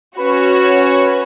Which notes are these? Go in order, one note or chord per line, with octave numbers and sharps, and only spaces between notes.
C#4 F#4 B4 C#5